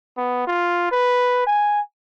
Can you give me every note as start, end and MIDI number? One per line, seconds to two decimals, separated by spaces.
0.17 0.45 59
0.47 0.91 65
0.92 1.44 71
1.47 1.81 80